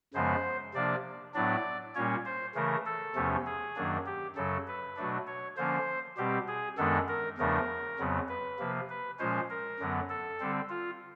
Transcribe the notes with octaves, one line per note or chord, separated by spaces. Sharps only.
F#2 C#3 F3 G#3 B3 C5
C3 F3 A#3 D4 D5
A2 F#3 B3 D4 D5
A#2 G3 A#3 C#4 C#5
C5
C#3 E3 A3 A#4
A4
E2 C3 F3 A3 C#4
G#4
F#2 D#3 F#3 A#3 D4
G4
F#2 C#3 F#3 A4
B4
B2 F#3 A3 D4
C#5
D3 F3 A#3 C#4 C5
B2 G3 C4 G4
G#4
F#2 D#3 G#3 B3 D4 A4
A#4
E2 C#3 F3 A3 D4 A#4
F2 C#3 F#3 B3
B4
C3 F3 A#3
B4
A#2 F3 G#3 C#4 C5
A#4
F#2 D3 F#3 B3
A4
D3 G3 C4
F4